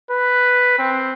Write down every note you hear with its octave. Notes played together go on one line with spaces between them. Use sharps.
B4
C4